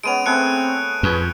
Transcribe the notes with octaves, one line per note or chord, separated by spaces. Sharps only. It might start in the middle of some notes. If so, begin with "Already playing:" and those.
G#3 B3 C#4 D7 D#7 F7
A3 C4 G#4 B4 F#6 C#7
F2 G#4 B4 C#6